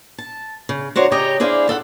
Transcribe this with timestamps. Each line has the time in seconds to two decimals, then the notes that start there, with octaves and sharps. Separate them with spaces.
0.18 A5
0.69 C#3
0.96 D4 F#4 C5 C#5 A#5
1.11 C#3 G4 C#5 D#5 A#5
1.40 D4 E4 G#4 C5 D5 F5
1.68 E2 A4 E5 F#5